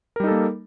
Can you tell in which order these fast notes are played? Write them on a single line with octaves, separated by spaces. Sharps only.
A#4 G3 D#4 A4 A#3